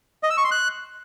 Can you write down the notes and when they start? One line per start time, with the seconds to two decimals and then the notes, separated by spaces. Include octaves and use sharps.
0.23 D#5
0.30 E6
0.37 C#6
0.44 C6
0.51 F#6